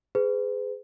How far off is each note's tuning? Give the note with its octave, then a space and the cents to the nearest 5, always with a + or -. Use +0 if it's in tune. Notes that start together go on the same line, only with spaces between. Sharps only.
G#4 +0 B4 +40